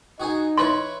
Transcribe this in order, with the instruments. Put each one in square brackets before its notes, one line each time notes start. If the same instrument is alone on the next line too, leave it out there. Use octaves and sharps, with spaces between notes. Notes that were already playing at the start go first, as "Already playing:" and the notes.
[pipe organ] D#4 [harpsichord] F#4 G#4 G#5
[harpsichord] E4 B4 C#5 [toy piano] C6